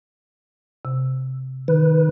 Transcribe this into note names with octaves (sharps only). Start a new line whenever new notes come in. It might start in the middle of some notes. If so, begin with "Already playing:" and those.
C3
D#3 B4